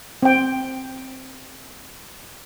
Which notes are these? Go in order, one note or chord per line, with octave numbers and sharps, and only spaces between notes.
C4 G5